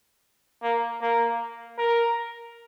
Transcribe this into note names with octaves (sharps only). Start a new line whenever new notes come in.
A#3
A#3
A#4